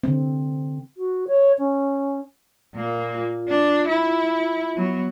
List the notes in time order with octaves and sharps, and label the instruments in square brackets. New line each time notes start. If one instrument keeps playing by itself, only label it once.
[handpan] D3 C4
[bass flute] F#4
C#5
C#4
[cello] A#2 A#3
[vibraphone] F4
[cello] D4
E4
[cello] F#3 [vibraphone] B3